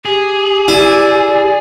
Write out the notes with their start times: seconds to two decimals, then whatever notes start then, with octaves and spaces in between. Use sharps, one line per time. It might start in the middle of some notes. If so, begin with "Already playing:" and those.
0.05 G4 G#4
0.68 E4 D5